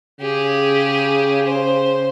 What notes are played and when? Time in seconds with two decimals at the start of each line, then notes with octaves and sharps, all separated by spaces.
0.21 C#3 G4 G#4
1.45 C5